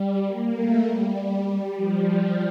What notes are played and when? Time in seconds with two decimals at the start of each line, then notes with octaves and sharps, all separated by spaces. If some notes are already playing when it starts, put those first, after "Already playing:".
Already playing: G3
0.26 A#3
0.56 A3
0.86 G3
1.75 F3